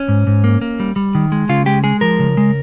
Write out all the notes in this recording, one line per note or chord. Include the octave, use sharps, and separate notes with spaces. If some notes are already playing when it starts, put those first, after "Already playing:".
Already playing: C#4
G#2
G#2
A#3
A#3
G3
G3
D#3
G#3
C#3 F4
G#3 G4
G#3 G#4
F3 A#4
C#3
G#3